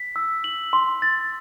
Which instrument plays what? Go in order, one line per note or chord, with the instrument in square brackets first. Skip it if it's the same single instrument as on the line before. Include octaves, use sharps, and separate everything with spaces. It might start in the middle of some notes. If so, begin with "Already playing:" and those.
Already playing: [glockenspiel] B6
E6
F#7
C6
A6